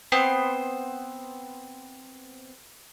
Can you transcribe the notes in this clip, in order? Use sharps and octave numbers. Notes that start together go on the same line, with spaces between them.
B3 C4 C5